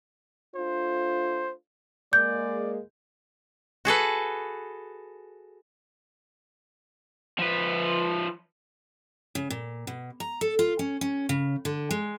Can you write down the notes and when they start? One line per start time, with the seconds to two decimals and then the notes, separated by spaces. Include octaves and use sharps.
0.56 A3 D4 F4 C5
2.13 G#3 A#3 D5 G6
3.85 F#4 G#4 A4 B4
7.39 F3 B4
9.35 C#3
9.50 A#2
9.87 B2
10.20 A#5
10.41 A4
10.59 F4
10.79 C#4
11.01 C#4
11.29 C#3
11.65 D3
11.91 G#3